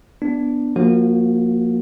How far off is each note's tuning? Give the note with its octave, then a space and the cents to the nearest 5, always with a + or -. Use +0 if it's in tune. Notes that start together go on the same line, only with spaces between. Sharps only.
B3 +0 D4 +0
F3 +20 A#3 +0 F#4 -5